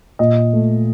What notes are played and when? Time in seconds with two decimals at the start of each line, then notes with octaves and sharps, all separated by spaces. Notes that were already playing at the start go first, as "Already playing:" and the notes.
0.19 A#2 D#5
0.53 A3